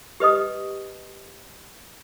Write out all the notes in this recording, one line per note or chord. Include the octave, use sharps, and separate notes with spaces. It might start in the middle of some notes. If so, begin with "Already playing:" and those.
G4 B4 D#5 D#6